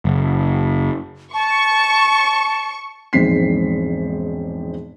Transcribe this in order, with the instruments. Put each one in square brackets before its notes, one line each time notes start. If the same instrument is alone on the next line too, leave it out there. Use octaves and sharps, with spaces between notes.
[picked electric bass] F#1
[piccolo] A5 [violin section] C#6
[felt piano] E1 A#1 G#2 C4 B6 C7